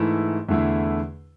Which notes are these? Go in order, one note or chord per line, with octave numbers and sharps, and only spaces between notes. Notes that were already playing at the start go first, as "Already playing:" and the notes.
Already playing: G#2 E3 A3 E4
E2 D3 A3 E4